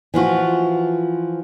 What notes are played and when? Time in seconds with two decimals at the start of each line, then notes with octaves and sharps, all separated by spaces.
0.14 E3 F3 F4 F#4